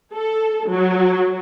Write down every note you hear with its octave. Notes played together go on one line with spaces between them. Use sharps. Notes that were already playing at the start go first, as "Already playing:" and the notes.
A4
F#3